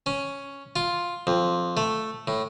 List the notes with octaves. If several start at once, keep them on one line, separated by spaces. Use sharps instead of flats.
C#4
F4
F2
A3
A2